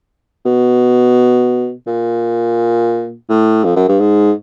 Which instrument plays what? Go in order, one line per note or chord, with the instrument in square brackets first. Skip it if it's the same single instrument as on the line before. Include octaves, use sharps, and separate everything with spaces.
[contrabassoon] B2
A#2
A2
F2
F#2
G2
G#2